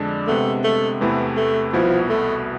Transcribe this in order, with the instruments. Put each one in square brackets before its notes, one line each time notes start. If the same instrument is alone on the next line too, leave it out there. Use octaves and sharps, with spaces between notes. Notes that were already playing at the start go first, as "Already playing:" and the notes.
Already playing: [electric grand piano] F2 D3 G#3 D4
[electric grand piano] C3 G#3 B3 [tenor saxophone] A3
[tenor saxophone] A3
[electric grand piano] E2 C3 E3 A3 E4 [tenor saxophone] B3
[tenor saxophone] A3
[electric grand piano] C2 B2 B3 E4 [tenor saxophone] F3
[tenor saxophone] A3